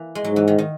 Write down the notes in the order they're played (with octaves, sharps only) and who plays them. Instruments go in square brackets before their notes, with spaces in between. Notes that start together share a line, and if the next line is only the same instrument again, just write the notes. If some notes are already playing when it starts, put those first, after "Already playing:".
Already playing: [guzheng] E3 A#3
G#3
[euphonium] G#2 [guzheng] F#3
[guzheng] E3
D#3
D#3